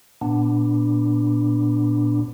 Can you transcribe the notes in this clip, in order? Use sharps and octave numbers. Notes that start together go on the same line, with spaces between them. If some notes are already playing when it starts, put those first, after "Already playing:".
A#2 B3 D4